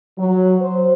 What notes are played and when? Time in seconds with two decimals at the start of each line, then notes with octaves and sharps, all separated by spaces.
0.18 F#3
0.61 C5